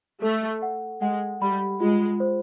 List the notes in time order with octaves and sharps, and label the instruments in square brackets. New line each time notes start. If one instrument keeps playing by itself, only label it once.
[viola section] A3 [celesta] A4
[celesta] F#5
[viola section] G#3 [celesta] F#5
[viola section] G3 [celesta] B5
[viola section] G#3 [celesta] F4
[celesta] C5